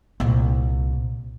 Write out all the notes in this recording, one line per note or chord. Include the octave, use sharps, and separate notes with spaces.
C2 A#2